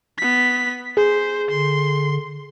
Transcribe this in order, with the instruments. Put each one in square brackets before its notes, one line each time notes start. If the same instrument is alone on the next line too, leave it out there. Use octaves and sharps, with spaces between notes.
[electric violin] B3 B6
[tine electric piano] G#4 [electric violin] C5
[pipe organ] D3 [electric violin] C6